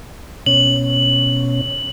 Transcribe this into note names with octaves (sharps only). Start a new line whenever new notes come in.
B2 C#4 F#7